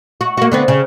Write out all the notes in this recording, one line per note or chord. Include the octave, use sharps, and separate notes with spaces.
F#4
A#3 F#4
D3 B3 C4
C#3